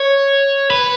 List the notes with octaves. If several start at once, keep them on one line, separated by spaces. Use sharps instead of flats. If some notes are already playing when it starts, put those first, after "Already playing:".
Already playing: C#5
B4